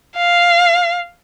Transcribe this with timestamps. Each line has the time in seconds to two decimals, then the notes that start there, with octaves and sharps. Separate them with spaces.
0.17 F5